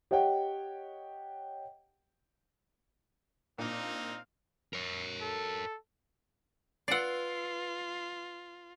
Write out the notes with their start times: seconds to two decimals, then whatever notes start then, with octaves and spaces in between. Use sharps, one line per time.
0.11 G4 C#5 D#5 F#5 G5
3.58 A#2 A#3 C4 D4 D#4 F5
4.73 A#4 C#5
5.21 A4
6.88 F4 B4 D5 F#5 C7